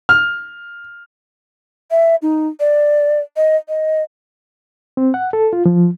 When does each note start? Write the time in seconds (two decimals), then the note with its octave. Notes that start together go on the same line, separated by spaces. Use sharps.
0.09 F6
1.91 E5
2.22 D#4
2.60 D5
3.37 D#5
3.68 D#5
4.97 C4
5.14 F#5
5.33 A4
5.53 F4
5.66 F3